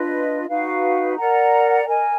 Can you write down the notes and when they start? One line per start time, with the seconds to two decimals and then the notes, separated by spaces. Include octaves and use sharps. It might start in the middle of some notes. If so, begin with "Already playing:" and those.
Already playing: D4 F4 B4 D#5
0.48 D#4 F#4 B4 F5
1.17 A#4 D5 F#5 A#5
1.86 A#4 D#5 G#5